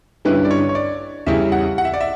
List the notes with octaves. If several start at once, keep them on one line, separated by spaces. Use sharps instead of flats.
G2 D3 G3 C#4 E4 B4
D5
C#5
C#5
D5
E2 C#3 G3 C#4 E4 E5
F#5
F#5
E5
D5
E5